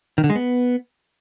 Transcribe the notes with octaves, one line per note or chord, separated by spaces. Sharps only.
D#3
D3
G#3
B3